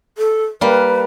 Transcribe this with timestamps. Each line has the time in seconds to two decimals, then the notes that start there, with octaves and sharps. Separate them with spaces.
0.18 A4
0.61 G3 A#3 B4